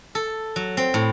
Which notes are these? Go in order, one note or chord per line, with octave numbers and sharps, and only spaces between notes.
A4
F#3
C4
A2